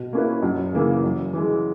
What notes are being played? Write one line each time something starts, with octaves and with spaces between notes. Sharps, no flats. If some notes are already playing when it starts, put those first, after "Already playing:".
Already playing: B2
A#3 C#4 E4 B4
F#2
C#3 E3 A#3
F#2
E3 G#3